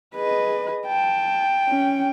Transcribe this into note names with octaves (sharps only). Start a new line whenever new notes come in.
G#4 B4 D#5
G5 A5
C#4